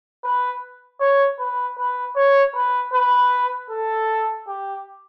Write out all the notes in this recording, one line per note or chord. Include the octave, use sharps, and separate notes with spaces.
B4
C#5
B4
B4
C#5
B4
B4
A4
G4